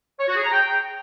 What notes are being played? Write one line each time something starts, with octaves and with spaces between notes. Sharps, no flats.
C#5
F#4
G#4
A#5
G5